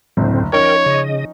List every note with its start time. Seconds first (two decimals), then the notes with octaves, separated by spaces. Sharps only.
0.17 F#1 D2 A2 C4
0.53 F3 C#4 D#4 A#4 C#5 G5
0.86 C#3 D#5